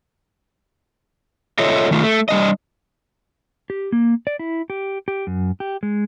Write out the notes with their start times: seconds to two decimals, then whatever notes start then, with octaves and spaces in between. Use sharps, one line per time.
1.59 F4 A4 C#5 D#5 E5
1.91 D#3 A3 F4
2.03 A3
2.29 G3 D4 D#5
3.70 G4
3.92 A#3
4.27 D5
4.39 E4
4.70 G4
5.08 G4
5.27 F#2
5.60 G4
5.83 G#3